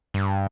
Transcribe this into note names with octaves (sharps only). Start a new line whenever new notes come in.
G2